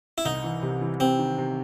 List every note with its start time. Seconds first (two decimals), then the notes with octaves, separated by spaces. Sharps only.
0.18 E4
0.25 C2 D#4
0.44 E3
0.63 C3
0.81 E3
1.00 C3 C4
1.19 D#3
1.38 C3